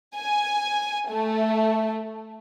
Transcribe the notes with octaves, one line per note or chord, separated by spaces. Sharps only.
G#5
A3